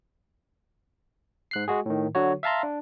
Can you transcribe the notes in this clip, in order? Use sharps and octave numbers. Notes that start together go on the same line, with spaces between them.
G#2 F#6 C7
G#3 F#4 G#4
A2 D#3
D3 F#3 F#4 C#5
E5 F5 A5 A#5 C6
D4